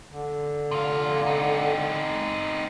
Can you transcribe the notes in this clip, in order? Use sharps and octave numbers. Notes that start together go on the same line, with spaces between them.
D3
C3 F4
C4 D#4